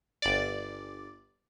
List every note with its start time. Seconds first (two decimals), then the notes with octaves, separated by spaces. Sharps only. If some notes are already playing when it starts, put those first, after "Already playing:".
0.22 G1 D5